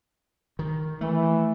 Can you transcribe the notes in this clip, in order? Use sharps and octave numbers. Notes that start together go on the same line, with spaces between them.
D#3
E3 A3